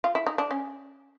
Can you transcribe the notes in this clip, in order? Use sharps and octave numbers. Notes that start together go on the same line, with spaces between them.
F4
E4
D#4
D4
C#4